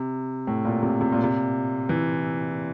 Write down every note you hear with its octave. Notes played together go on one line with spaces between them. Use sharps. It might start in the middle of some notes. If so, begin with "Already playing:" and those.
Already playing: C3
A2
A#2
C3
C3
A#2
C3
E3